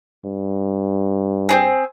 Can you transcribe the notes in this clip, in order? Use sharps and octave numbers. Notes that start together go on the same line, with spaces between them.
G2
C4 D4 G#4